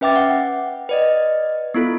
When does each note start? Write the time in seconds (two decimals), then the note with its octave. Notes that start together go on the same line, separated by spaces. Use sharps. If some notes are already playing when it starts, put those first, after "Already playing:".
0.01 C#4 B4 E5 G5 D6 A6
0.16 F#5
0.89 B4 D5 D#5
1.74 B3 E4 F4 A4